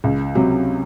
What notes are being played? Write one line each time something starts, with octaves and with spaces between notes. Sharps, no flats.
C#2
C3 F#3